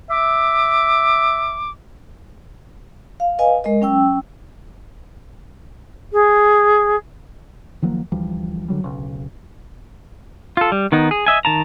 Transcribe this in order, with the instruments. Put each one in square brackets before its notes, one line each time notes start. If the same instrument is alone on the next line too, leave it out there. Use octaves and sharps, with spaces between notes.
[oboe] E5 [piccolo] D6
[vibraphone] F5
B4 D#5 F5 G#5
G#3 A#4 D#5
F#3 C#4 G5 E6
[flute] G#4
[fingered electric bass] D#3 F3 F#3 A#3
D2 E3 F3 G3
D3 F#3 G3
D1 B1 C#3
[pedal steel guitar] F4 A4
G3
D#3 B3 D#4
G#4
D#5 E5 G#5
D#3 A5 A#5